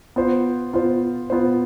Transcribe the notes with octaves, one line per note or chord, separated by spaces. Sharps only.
B3 F4 C5
B3 F4 C5
B3 F4 C5